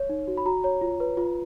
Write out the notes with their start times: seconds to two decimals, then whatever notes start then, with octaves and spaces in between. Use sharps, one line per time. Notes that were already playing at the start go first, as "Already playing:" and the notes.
Already playing: C#5
0.09 D#4
0.27 F#4
0.37 B5
0.46 F#4 A#5
0.64 C#5 A#5
0.81 F4
1.00 B4
1.17 F4